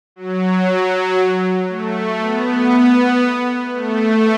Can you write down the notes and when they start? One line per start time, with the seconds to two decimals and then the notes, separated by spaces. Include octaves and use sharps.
0.16 F#3
1.69 A3
2.20 B3
3.74 A3